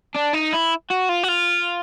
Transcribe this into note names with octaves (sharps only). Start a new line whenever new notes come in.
D4
D#4
E4
F#4
F4
F#4
F4